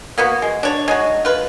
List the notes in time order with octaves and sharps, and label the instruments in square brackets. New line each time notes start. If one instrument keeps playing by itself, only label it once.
[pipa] A#3 B3 F#4
G#3
D4 C#5
G#3 D#4 F#4
F4 B4